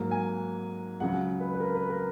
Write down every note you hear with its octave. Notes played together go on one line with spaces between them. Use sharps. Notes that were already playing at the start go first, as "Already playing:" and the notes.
Already playing: G#2 F#3 A#3
G#5
C#2 C#3 F#3 F#5
B4
B4
A#4
B4
A#4